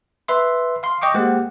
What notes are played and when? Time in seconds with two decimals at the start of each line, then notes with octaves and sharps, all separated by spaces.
0.28 B4 E5 C6
0.83 F5 C6
1.02 D#5 G5 C#6 D6
1.14 G#3 A#3 G4 C5 F#5